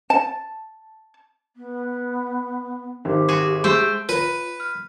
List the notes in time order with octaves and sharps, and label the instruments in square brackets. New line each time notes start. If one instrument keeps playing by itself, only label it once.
[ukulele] A5
[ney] B3
[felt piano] G#1 [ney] G4
[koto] F#4 G#4
[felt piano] G#3 [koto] A3 C5 G5
[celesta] F4 C#5 D#7 [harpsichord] B4
[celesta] F6